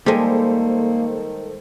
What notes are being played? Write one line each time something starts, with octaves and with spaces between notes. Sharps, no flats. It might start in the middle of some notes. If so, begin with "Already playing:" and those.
D#3 G3 G#3 A#3 A4 C5